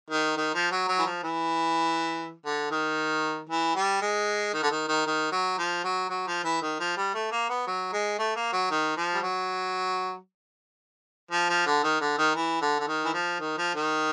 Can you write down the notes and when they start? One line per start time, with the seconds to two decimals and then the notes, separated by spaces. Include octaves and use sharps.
0.10 D#3
0.37 D#3
0.54 F3
0.71 F#3
0.88 F#3
0.98 E3
1.06 F3
1.23 E3
2.45 D3
2.71 D#3
3.49 E3
3.75 G3
4.01 G#3
4.53 D#3
4.63 D3
4.70 D#3
4.88 D#3
5.06 D#3
5.32 F#3
5.58 F3
5.84 F#3
6.10 F#3
6.27 F3
6.44 E3
6.62 D#3
6.80 F3
6.97 G3
7.14 A3
7.32 A#3
7.49 B3
7.67 F#3
7.93 G#3
8.18 A3
8.36 A#3
8.53 F#3
8.71 D#3
8.97 F3
9.14 G3
9.23 F#3
11.31 F3
11.49 F3
11.66 D3
11.83 D#3
12.01 D3
12.18 D#3
12.35 E3
12.62 D3
12.79 D3
12.88 D#3
13.05 E3
13.14 F3
13.40 D#3
13.58 F3
13.75 D#3